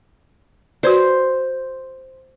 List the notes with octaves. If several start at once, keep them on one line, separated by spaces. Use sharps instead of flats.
F#4 B4 C5 D5